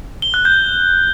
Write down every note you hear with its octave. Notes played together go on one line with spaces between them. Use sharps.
G7
F#6
G6